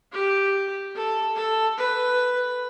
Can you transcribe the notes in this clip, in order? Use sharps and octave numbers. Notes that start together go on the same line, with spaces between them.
G4
A4
A4
B4